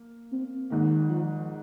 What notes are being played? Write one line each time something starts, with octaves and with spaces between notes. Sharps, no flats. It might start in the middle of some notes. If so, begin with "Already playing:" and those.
Already playing: A#3
C4
G#1 G#2 D#3 A#3
F3